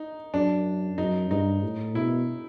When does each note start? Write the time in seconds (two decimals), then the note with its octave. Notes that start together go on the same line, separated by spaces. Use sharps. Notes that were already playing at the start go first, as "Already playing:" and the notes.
Already playing: D#4
0.34 F#2 D4
0.98 F#2 D#4
1.31 G2 D#4
1.63 A2
1.95 B2 E4